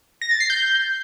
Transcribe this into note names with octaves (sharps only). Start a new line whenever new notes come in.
A#6
A6
C7
G6